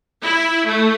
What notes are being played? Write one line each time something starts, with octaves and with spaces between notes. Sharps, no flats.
E4
A3